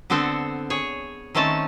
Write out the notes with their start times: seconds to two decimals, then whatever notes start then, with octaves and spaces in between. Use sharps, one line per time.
0.10 D3 B3 C4 A4 C5
0.70 G#4 C#5
1.35 D#3 A3 C4 C#4 A5